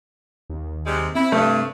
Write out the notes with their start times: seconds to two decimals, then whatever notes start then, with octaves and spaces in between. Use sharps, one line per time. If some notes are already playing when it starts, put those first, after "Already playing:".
0.50 D#2
0.86 C3 G3 G#3
1.15 C4 E4
1.32 G2 C3 A3